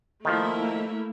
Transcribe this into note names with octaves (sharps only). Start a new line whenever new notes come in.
D#3 F3 A3 A#3 E4